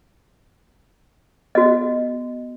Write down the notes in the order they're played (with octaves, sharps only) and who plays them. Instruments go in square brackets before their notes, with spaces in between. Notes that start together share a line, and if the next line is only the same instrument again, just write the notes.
[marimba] B3 [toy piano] F#4 D#5